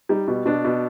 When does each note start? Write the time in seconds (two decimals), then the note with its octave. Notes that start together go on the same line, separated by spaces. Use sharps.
0.09 G3 D#4
0.28 B2
0.46 B2 D4
0.65 B2